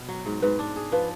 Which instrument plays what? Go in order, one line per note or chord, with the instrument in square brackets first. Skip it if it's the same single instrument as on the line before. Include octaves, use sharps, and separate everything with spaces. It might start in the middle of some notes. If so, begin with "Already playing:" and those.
Already playing: [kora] B2
F#3
G#2
[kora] G#2 [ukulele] B4
[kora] D4
G#4
[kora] F3 [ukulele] B4